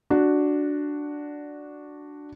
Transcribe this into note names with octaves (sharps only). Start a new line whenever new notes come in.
D4 F#4